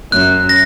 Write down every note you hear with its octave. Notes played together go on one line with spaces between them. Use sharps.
F#2 F#6
A#6